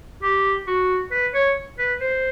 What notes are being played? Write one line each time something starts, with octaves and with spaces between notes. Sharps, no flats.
G4
F#4
B4
C#5
B4
C5